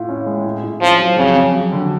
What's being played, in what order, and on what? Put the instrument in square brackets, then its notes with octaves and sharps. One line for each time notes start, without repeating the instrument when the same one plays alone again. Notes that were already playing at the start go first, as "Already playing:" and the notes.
Already playing: [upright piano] A2 F4
C#4
G#3
A2
A2
[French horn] F3 [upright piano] C#4
[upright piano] F#3
[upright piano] F2 [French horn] C#3
[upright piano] F2
F#3
D3